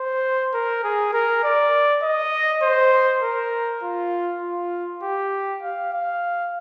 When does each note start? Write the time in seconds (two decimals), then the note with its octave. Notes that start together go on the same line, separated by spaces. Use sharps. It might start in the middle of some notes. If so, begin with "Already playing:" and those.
Already playing: C5
0.54 A#4
0.84 G#4
1.14 A#4
1.44 D5
2.03 D#5
2.63 C5
3.23 A#4
3.83 F4
4.42 F4
5.03 G4
5.63 F5
5.93 F5